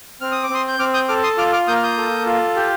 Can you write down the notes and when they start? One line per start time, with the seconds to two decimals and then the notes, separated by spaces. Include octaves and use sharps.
0.21 C4 F6
0.32 D#6
0.43 D6
0.50 C4 C6 D#6
0.68 G6
0.79 C4 D6 F6
0.94 D#6 G6
1.08 A4 D6 F6
1.23 C6 D#6
1.38 F4 D6 F6
1.52 D6 F6
1.67 A#3 D#6 G6
1.76 F6
1.83 D#6 G6
1.98 A4
2.26 F4
2.56 G4